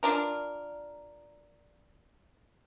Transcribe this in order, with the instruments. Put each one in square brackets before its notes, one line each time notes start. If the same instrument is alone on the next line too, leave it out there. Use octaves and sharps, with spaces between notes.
[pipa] D4 F4 A#4